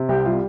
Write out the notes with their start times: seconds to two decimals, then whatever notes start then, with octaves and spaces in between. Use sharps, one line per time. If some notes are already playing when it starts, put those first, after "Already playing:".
Already playing: C3
0.09 C2 G4
0.25 G3 F4